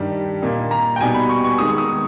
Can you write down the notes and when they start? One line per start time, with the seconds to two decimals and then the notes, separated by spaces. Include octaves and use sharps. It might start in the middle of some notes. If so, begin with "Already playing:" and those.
Already playing: G2 D#3 G3
0.42 A#2 A#3 D#4
0.71 A#5
0.96 G5
1.01 B2 G3 B3 D#4 G#5
1.15 B5
1.29 C#6
1.44 C#6
1.58 D#3 G#3 B3 D#4 D#6
1.68 C#6
1.78 D#6